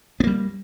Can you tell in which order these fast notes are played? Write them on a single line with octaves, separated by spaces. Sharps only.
B3 A#3 G3